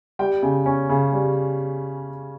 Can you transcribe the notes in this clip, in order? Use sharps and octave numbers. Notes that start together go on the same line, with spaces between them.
G3 G5
C#3
C#4
C#3
G3